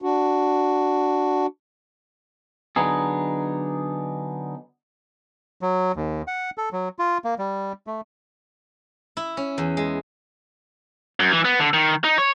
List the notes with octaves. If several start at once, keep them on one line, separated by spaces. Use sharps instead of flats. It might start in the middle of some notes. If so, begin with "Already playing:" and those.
D4 F#4
D3 F#3 B3 D4 D#4 G#4
F#3
D#2
F#5
A4
F#3
F4
A#3
G3
A3
E4
C#4
E2
G#3
F#2
E3
B3
D3
D#3
D#4
C#5